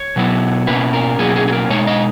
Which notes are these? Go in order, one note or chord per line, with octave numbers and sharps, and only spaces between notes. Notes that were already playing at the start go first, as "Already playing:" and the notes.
Already playing: C#5
B2 F#3 B3 E4
B2 A#3 C#4 E4 B4
A#4
B2 F#3 A#3 C#4 E4 G#4
G#4
G#4
A#4
B2 G#3 D#4 C#5
D#5